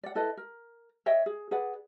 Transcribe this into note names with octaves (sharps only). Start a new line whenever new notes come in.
D5 F#5
E4 A4 B4 D#5
A#4
C#5 D#5 E5 G5
G#4
G#4 B4 D5 F#5